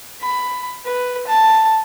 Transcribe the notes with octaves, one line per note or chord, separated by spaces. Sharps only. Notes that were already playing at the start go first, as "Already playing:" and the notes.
B5
B4
A5